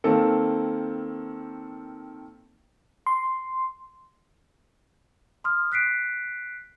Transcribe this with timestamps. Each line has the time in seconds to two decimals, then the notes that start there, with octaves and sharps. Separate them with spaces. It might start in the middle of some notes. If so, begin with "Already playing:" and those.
0.04 D#3 A#3 C4 A4
3.06 C6
5.44 C6 D#6 F6
5.72 F#6 B6 C7 D7